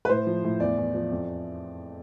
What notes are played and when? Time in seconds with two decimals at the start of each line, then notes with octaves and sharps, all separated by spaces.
0.05 B4
0.09 A2 C5
0.27 F3
0.44 A2
0.60 E2 D5
0.77 E2
0.94 F3
1.11 F2